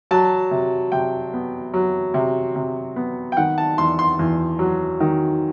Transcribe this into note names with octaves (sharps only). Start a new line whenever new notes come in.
F#3 A5
C3
C3 G5
B3
F#3
C3
C3
B3
G5
D#3 F#5
A5
E2 C6
C6
E2
F#3
D#3